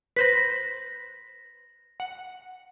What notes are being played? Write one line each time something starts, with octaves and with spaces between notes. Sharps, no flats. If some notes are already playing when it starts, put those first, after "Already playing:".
B4 C5 B5 A#6 B6
F#5